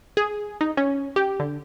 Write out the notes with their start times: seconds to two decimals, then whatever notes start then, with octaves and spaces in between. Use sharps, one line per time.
0.17 G#4
0.61 D#4
0.77 C#4
1.16 G4
1.40 D3